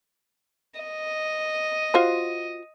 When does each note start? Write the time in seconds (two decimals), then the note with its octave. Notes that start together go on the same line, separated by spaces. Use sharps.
0.81 D#5
1.94 F4 F#4 C5